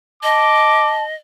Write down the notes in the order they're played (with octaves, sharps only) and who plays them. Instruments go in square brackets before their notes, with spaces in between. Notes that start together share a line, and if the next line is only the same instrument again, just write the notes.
[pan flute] D#5 [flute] A5 [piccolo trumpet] D6